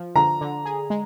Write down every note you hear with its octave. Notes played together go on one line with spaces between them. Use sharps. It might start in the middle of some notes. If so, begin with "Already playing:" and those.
Already playing: F3
D3 A#5
D3
G#4
G#3